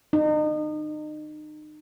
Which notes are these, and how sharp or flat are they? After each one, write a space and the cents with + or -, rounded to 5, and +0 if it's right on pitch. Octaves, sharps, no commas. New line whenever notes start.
D#4 -35